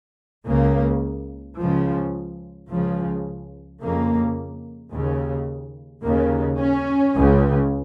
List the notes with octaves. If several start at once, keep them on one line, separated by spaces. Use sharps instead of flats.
C#2 C#3 A#3
C#2 C#3 F3
C#2 C#3 F3
F2 C#3 A#3
D#2 C#3
D#2 C#3 A#3
C#4
C#2 C#3